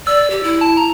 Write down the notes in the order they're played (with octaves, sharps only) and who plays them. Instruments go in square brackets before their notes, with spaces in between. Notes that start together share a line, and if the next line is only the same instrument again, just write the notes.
[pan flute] D5 [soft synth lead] E6
[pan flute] G4
E4
[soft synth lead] A5
A#5